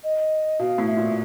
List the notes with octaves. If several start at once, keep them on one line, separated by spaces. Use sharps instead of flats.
D#5
B2 F5
A2
E5
A#2